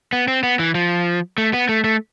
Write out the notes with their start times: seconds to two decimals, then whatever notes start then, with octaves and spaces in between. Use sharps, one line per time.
0.13 B3
0.28 C4
0.43 B3
0.59 E3
0.75 F3
1.38 A3
1.53 B3
1.69 A3
1.84 A3